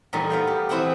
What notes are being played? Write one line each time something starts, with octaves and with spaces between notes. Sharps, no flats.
E2 A#2 G3 A3 D#4
B3 F5 G5
G4
E3 C4 E4 G#4 F#5 G5